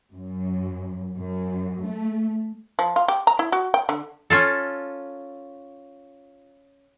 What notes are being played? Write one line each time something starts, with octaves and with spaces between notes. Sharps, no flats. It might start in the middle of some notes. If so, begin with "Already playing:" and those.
F#2
F#2
A3
F3
F4
G4
A#5
E4
F#4
G5
D3
C#4 F4 A4